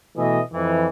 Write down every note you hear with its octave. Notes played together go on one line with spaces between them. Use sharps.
B2 E3 A3 D#5 E5
F2 E3